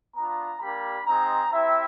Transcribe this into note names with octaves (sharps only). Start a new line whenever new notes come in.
B3 D4 F4 A#5
G3 A#3 D4 G4 B5
G#3 C4 D#4 A#5
C4 E4 G4 E5